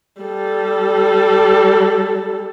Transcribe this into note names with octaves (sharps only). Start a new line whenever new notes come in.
G3 A4